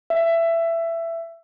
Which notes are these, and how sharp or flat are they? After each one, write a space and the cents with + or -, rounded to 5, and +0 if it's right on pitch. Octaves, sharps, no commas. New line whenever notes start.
E5 +15